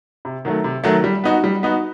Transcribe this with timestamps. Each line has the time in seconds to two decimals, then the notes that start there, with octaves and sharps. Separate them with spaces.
0.25 C3
0.45 D#3 F#3 A3
0.64 C3
0.84 D#3 F#3 A3
1.04 G3
1.24 B3 D#4 F#4
1.44 G3
1.63 B3 D#4 F#4